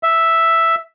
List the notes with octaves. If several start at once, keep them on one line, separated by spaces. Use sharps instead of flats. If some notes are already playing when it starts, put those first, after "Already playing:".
E5